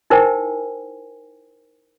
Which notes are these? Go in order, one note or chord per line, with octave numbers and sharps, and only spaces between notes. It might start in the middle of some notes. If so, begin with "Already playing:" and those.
D#4 E4 A#4 C5 G5 G#5